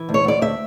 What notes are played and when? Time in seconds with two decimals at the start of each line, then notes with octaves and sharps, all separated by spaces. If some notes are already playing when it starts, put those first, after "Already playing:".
Already playing: E3
0.09 D2
0.14 C#5
0.24 D2 D5
0.41 D2 E5